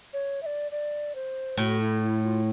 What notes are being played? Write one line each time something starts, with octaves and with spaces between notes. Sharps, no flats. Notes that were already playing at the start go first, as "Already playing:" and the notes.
C#5
E5
D5
D5
C5
A2 F#4
E4
E4
F4